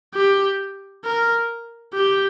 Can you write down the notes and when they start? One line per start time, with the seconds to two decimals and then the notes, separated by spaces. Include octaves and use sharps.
0.14 G4
1.04 A#4
1.94 G4